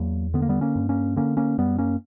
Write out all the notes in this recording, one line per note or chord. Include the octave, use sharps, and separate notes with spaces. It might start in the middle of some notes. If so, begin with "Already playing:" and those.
Already playing: E2 F#3 A#3
D3 B3
A#3
G3 B3
A#3 C#4
G2
A#3 C#4
D3 A#3 C#4
A#3 C#4
F#2 G3 B3
A#3 C#4